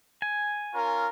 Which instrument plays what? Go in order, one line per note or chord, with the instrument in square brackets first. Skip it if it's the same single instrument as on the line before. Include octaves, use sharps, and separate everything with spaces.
[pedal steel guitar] G#5
[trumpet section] C#4 F4 A#4